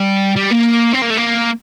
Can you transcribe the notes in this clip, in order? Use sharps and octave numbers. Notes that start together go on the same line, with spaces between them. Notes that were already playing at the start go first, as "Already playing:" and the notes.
Already playing: G3
G3
A#3
C4
A#3
A3
A#3